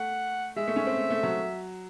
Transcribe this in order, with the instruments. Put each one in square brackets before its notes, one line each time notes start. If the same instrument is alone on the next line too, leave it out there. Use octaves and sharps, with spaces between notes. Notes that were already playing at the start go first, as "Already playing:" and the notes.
Already playing: [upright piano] A3 [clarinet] F#5
[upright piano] G#3 [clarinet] E5
[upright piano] A3
C#4
C4
A3
A3
F#3